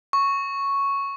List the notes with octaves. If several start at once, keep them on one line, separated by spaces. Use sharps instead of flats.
C#6